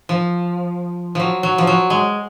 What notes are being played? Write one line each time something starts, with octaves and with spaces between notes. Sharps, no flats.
F3
F3 F#3
F#3
F3
F#3
G#3